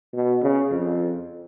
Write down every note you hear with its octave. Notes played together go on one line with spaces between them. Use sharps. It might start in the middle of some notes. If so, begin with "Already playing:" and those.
B2
C#3
F2